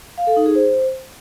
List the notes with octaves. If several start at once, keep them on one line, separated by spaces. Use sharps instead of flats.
F5
A4
D#4
G#4
C5